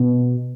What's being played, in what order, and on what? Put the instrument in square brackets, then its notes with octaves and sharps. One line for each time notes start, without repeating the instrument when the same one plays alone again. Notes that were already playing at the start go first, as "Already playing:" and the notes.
Already playing: [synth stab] B2